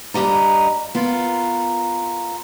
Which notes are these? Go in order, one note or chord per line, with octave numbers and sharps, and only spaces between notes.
G2 F#3 G4 D#5 A#5
B3 F4 A#4